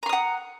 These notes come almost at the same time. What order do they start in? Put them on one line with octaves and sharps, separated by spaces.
A#5 C6 D#6 F#5